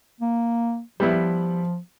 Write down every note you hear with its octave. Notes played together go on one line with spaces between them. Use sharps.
A#3
F3 G3 B3 E4